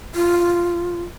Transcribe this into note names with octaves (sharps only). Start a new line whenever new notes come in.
F4